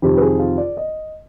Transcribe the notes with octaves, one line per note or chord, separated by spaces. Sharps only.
F2 C3 D#3 G4
B4
G#4
F4
D5
D#5